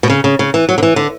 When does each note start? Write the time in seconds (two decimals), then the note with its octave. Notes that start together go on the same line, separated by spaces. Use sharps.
0.03 B2
0.10 C#3
0.24 C#3
0.39 C#3
0.54 E3
0.69 F#3
0.78 D3
0.83 E3
0.96 D3